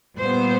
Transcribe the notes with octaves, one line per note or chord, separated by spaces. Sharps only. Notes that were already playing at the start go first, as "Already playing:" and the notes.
A#2 G3 B3 C5